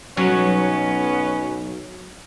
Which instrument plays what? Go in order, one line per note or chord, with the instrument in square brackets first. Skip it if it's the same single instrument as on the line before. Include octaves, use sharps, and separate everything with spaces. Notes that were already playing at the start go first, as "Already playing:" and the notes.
[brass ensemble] B1 [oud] F#3 [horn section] B3 C#4